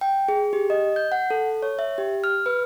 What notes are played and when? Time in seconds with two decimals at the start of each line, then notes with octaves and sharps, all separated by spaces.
0.01 G5
0.28 G#4
0.53 G4
0.70 D#5
0.96 G6
1.12 F#5
1.31 A4
1.62 C#5
1.79 E5
1.98 G4
2.24 F6
2.46 B4